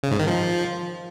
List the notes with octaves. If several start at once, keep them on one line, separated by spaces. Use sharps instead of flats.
C#3
G#2
D#3
F3